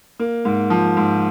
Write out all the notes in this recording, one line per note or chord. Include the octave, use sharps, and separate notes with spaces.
A#3
G#2
F3
G#2